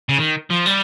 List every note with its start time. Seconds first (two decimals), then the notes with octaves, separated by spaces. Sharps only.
0.09 C#3
0.17 D#3
0.51 F3
0.66 G3